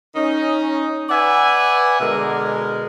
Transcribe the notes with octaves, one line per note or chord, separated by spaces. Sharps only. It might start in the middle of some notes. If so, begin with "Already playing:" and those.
C#4 D#4
B4 D5 E5 F#5 G#5
B2 D3 G#3 A#4